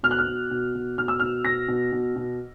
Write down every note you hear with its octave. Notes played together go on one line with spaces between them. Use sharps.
B2 F6
F#6
F6
B2
B2
B2
B2 F6
E6
B2 F6
B2 A#6
B2
B2
B2